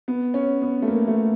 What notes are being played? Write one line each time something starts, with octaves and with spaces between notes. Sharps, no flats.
B3
C#4
B3
A3
A#3
A3